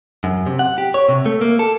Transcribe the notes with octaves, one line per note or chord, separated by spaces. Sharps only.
F#2
C3
F#5
G4
C#5
C3
A3
A#3
A4